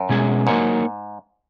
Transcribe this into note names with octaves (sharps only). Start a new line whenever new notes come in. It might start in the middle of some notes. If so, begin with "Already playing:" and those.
Already playing: F#2
B2 G#3 C#4 G#4
G#2 F#3 A#3 D#4 A#4 C#5